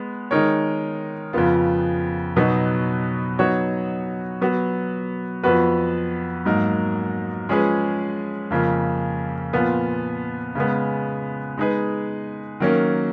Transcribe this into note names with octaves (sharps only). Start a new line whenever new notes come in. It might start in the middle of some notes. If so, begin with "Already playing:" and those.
Already playing: G#3 B3
D#3 G#3 D#4 A#4 C#5
F2 C#3 F3 B3 F4
B2 F#3 B3 D#4
F#3 B3 D#4 F#4 C#5
F#3 B3 F#4
F2 F3 B3 F#4 B4
G#2 F#3 A#3 D#4 A#4
F3 G#3 C#4 G#4 B4
F2 C#3 F3 A#3
A#2 F3 B3 F4
C#3 G#3 B3
G#3 D#4 G#4 B4
D#3 F#3 A#3 C#4